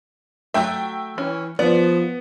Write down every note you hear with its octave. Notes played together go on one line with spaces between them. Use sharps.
F#3 A3 E5 G5
E3 C#4
F3 B3 D5